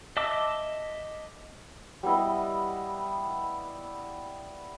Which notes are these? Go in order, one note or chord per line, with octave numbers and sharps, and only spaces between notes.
D#5 E5 A5 D6 E6
G3 B3 E4 D#5